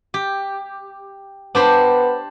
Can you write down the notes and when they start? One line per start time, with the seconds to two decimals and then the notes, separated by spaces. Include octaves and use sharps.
0.14 G4
1.55 B3 D4 G4 C5